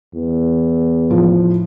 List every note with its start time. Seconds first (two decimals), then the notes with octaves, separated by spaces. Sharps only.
0.14 E2
1.10 A2 F3